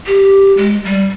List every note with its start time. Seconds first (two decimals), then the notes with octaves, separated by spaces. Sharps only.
0.07 G4
0.57 G#3
0.85 G3